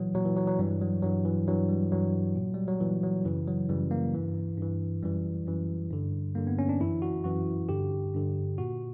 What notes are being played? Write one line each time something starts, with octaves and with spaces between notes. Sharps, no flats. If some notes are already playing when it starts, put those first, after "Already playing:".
Already playing: A#2 E3 F#3
A#2 F#3
E3
F#3
F#3
G2 E3 G3
F#3
G2 E3 F#3
E3
G2 E3 F#3
G3
G2 E3 F#3
A#2
G3
F#3
A#2 E3
F#3
F#2 C#3 E3
F#3
F#2 C#3 E3 G3
A#3
G2 E3
G2 E3
F#2 E3 G3
F#2 E3
G2 D3
G2 D3 A#3
B3
C#4
D4
F#2 E3 E4
F#4
F#2 E3 F#4
G2 D3 G4
G2 D3
A#2 F#4